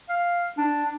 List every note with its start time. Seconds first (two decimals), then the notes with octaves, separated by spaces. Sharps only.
0.09 F5
0.58 D4